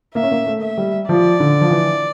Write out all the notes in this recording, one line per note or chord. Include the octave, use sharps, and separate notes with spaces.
A#3 E5
C#4
A#3
A3
E5
G3
F3 D5
D3
F3
E3